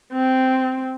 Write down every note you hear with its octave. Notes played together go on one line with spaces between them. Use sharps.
C4